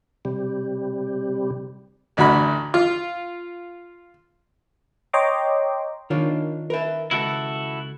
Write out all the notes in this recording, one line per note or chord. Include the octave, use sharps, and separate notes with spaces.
C3 G3
A1 D2 F#4 B5
F4
C#5 D#5 G5 A#5 C6 D6
D#3 D4 F4 A#4 C#5
A#4 B4 E5
C#2 E4 F#4 A4